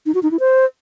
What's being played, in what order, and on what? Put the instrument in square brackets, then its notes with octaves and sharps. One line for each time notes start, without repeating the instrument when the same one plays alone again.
[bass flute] D#4
F#4
D#4
E4
C5